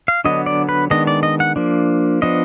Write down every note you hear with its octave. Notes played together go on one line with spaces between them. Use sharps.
F5
D3 F#3 B3 D4 D#5
D5
B4
D#3 G#3 B3 D4 D#5
D5
D#5
F#5
F3 A#3 D4
F3 B3 D4 D#5